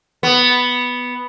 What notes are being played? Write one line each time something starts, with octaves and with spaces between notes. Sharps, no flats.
B3